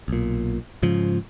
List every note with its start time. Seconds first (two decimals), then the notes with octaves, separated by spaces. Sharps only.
0.08 B1 A#2
0.83 G#2 C#3 F3